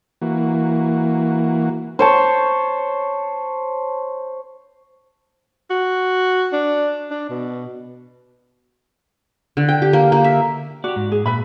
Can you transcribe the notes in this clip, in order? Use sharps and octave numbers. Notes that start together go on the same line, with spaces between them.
E3 A#3 F#4
C5 C#5 A5
F#4
D4
D4
B2
D3
G5
G4
A#3
A#3
E5
F#4 G4 D5
G#2
G#4
A#2 B4 E5 B5